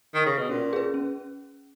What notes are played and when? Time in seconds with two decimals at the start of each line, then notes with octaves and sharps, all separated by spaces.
0.14 D#3
0.26 C#3
0.38 B2
0.49 A#2 C#4
0.73 G#4 B4
0.94 C#4